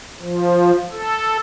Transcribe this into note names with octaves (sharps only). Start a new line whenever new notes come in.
F3
A4